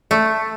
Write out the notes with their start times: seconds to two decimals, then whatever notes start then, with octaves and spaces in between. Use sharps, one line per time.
0.11 A3